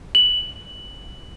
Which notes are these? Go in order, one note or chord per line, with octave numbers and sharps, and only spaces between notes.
F#7